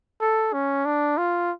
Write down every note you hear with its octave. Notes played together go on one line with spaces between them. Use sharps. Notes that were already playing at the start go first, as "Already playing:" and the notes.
A4
C#4
D4
F4